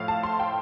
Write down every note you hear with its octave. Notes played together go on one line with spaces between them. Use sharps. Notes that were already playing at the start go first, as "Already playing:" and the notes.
Already playing: A2 F3 F5
A5
C6
G5